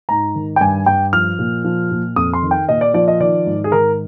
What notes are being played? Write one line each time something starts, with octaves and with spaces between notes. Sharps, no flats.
G#2 A#5
D#3
G5
G2 G#5
G2 G5
F3 F6
A#2
F3
A#2
F2 D#6
C6
D#3
G5
A#2 D#5
D5
F3 D5
D#5
D#3 D5
G#2
G#4
D#3 A#4